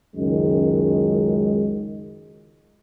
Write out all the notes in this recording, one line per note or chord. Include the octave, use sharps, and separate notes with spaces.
C#2 F#2 D#3 G#3